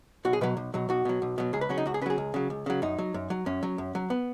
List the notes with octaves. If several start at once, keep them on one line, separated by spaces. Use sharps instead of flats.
B1 F#4
G#4
B2 F#3 B4
B1
B2 F#3
B1 F#4
B2 F#3
B1
B2 F#3
C#2 G#4
B4
C#3 F#3 C#4
D#4
C#2 F#4
G#4
C#3 F#3 G#4 B4
C#2
C#3 F#3
C#2
C#3 F#3
F#2 D#4
F#3
F#2
F#3
F#2 C#4
F#3
F#2
F#3
B3